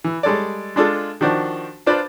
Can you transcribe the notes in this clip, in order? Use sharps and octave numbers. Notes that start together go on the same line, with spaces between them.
E3
G3 G#3 A4 C#5 D5
G#3 D4 F4 A4
D#3 F3 D4 F#4 C5
D4 F4 B4 C5 D5 B5